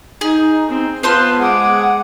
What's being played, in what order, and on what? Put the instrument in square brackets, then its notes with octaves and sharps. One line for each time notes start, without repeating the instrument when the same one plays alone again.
[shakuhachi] D#4 [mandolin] G#4
[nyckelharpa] C4
[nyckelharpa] B3 B4 [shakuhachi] F4 [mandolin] C5 A5 C6
[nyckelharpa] G#3 D6 [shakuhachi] F#5